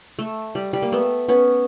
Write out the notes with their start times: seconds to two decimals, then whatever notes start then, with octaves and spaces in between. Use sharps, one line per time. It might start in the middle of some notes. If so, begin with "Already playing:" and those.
0.19 A3
0.55 G3
0.73 G3
0.82 A#3
0.92 A3 B3
1.29 B3 C#4